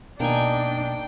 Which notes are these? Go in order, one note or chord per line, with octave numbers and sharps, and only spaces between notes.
B2 A#3 D4 D#4 G5 G#5